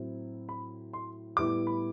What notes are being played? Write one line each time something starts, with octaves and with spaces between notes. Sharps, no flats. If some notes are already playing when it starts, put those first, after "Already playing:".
Already playing: A2 F#3 C4 E4
B5
C6
A2 G3 B3 E4 D6
B5